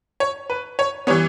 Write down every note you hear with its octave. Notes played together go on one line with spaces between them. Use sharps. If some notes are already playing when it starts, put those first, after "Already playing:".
C#5
B4
C#5
E3 G3 B3 C#5